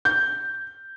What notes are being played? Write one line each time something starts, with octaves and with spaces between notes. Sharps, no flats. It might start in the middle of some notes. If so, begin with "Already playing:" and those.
G6